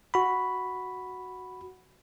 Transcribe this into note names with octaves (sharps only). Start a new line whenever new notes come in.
F#4 B5